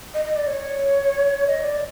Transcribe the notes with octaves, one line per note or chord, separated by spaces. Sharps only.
D#5
D#5
D5
C#5
D#5
D5